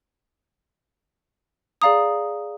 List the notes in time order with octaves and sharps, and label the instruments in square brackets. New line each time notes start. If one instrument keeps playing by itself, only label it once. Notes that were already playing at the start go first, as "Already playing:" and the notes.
[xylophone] G#4 D5 F5 A#5 D#6